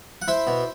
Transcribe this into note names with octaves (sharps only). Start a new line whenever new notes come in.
F#5
E4 C5 E5
B2